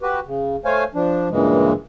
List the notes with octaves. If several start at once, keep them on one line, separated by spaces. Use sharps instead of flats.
F#4 G4 B4
C#3
A3 C5 C#5 F5 G#5
F3 D4
G2 A#2 C#3 E3 G#3